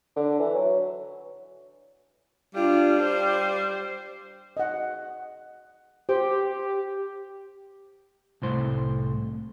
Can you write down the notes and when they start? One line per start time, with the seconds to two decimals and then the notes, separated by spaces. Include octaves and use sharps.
0.16 D3
0.40 E3
0.54 F#3
2.55 G3 D4 F4
3.03 C5
4.57 D#5 F#5
6.09 G4 C5
8.42 C2 A2 C5